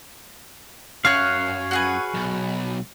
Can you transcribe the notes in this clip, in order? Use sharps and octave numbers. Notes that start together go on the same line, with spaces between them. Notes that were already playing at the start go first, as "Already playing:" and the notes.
F#2 C#5 F5 C#6 F6 F#6
F#4 G#4 B4
B1